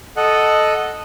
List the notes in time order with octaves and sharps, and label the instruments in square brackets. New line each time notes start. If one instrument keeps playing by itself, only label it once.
[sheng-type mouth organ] A4 D#5 F#5